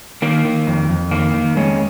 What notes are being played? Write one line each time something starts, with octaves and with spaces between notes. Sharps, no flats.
D#3 A#3
D#3
F2
F2
D#3 A#3
D#3
F2 G#3 C#4